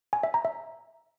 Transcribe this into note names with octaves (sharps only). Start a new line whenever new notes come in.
G#5
E5
A#5
E5